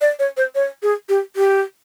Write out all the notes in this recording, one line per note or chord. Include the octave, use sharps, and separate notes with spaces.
D5
C#5
C5
C#5
G#4
G4
G4